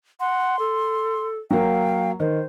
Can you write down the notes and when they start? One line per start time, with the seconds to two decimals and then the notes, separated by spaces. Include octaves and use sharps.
0.20 F#5 C6
0.59 A4
1.51 F#3 A#3 F5 G5
2.20 D#3 C5